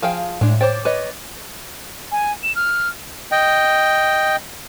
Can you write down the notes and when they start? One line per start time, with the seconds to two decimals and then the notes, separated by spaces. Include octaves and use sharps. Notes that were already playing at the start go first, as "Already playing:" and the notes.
0.03 F3 G#4 F5 G5
0.41 A2 G#3 D4
0.61 C5 C#5 G5 D6 A6
0.85 B4 C#5 D#5
2.12 G#5
2.43 E7
2.56 F6
3.32 D#5 G5